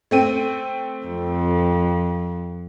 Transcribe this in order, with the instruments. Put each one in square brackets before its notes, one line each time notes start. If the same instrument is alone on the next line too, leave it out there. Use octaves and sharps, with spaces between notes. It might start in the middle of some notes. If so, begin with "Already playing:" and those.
[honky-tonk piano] A3 C4 D#7
[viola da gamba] F2